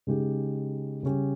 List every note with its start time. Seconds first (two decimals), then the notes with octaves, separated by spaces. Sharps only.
0.07 C#3 G#3 D#4 G4
1.03 C#3 G3 C#4 G4